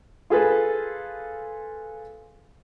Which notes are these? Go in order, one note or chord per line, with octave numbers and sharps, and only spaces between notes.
F4 G#4 A4 B4